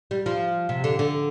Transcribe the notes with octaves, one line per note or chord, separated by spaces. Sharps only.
G3
F3
C3
D3
D3